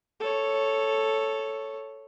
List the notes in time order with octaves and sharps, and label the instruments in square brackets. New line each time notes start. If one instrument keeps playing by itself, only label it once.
[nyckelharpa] A4 C#5